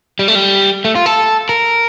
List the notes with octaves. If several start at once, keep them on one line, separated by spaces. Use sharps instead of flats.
G3
A3
G3
A3
F4
A4
A#4